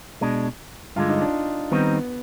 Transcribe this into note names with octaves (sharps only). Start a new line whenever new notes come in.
B2 G#3 D4
G2 D3 G#3 F4
D#4
D4
D#3 G3 B3 C4 D#4